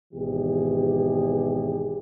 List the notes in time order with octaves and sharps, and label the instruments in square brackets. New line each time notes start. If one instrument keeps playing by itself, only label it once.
[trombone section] G#1 B2 E3 G4 G#4